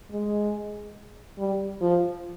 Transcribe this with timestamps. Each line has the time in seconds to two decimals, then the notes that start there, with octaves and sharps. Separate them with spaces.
0.11 G#3
1.38 G3
1.81 F3